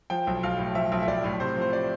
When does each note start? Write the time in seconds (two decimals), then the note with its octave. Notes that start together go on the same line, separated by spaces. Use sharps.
0.10 F3 G5
0.27 B1
0.43 B1 F5
0.58 A2
0.74 F3 E5
0.92 B1
1.03 E5
1.07 B1 D5
1.24 A2
1.40 C3 C5
1.56 F3
1.62 C5
1.73 D5